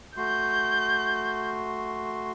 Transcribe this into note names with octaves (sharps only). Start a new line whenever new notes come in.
A3 F#4 C6 G6